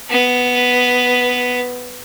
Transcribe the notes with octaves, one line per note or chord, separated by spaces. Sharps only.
B3 B4